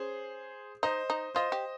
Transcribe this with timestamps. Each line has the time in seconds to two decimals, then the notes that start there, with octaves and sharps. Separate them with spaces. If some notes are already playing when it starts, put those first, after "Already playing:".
Already playing: C#4 G#4 C5
0.83 D#4 C5 D#5
1.10 D#4
1.35 F4 C5 D#5
1.52 G4